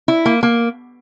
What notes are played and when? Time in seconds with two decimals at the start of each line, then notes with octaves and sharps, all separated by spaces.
0.08 E4
0.25 A#3
0.43 A#3